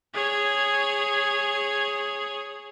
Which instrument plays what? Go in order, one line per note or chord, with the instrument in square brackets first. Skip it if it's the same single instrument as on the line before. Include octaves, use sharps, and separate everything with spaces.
[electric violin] G#4 C#5